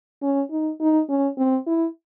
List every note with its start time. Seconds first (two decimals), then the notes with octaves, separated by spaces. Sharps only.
0.22 C#4
0.51 D#4
0.80 D#4
1.09 C#4
1.37 C4
1.66 E4